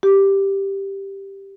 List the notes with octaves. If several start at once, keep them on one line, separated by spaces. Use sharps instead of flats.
G4